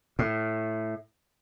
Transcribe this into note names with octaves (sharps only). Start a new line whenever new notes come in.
A2